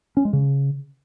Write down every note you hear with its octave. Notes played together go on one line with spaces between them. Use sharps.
C#4
G#3
C#3